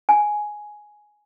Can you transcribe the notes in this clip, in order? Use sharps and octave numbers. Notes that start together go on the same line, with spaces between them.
G#5